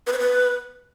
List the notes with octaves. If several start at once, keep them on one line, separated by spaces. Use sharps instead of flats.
B4
C5
B4